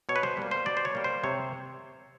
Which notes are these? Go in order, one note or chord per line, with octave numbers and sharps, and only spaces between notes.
B2 C#5
B4
C5
G3 A#3
C5
B2 D5
C5
C#5
G3 A#3
C5
C3 C#5